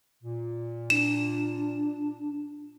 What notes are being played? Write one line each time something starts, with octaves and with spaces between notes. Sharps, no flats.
A#2
D4 E7